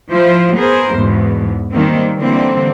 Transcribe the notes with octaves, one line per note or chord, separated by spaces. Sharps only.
F3 E4 F4 C5
B3 G#4 A#4 C5
E2 G#2 B2
D#3 G3 A#3 C4
D3 E3 G3 A#3 C4